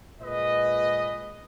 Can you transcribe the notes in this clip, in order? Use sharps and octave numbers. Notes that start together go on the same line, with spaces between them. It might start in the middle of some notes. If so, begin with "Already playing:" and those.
A#2 G#3 B4 D#5